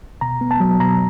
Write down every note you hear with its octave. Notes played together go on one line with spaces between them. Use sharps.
B2 A#5
B3
A5
F#3
B2 A#5